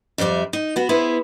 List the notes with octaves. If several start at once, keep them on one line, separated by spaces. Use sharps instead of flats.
F2 G3 C5 D5 E5
D#4
B3 F#4
B3 E4 G#4 C5